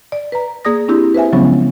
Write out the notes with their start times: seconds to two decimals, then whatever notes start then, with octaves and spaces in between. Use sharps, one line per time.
0.12 D5
0.32 B4 A#5
0.65 A#3 G#4 D5 D#6 A#6
0.88 C4 D4 E4 G4
1.14 B4 C5 E5 G#5
1.33 C#3 F3 F#3 G#3 B3 C#4